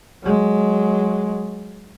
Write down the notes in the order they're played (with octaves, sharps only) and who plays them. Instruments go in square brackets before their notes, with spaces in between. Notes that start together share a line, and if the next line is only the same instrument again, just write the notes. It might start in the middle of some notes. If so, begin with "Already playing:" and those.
[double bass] F#3 G#3